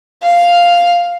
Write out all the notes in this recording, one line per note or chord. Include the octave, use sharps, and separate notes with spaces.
F5